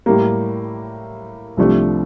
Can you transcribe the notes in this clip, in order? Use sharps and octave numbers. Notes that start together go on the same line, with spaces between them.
A2 G3 A#3
C2 C3 F3 A3 D4